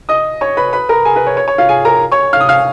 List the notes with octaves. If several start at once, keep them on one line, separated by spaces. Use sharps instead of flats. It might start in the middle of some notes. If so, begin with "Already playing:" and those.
D#5 D#6
C#5 C#6
B4 B5
B4 B5
A#4 A#5
G#4 G#5
B4
C#5
C#5
C#5
F4 F5
G#4 G#5
A#4 A#5
C#5 C#6
F5 F6
D#6
F5 F6